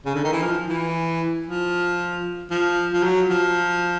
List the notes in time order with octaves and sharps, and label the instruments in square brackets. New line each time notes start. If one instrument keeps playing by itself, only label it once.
[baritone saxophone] C#3
D3
D#3
E3
F3
E3
F3
F3
F3
F#3
F3